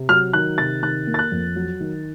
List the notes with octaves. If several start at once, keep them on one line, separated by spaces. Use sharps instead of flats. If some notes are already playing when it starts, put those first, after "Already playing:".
Already playing: C3
F#3 F6
D#3 F#6
C3 A6
D#3 F#6
A#3
A6
F#6
F2
F#3
D#3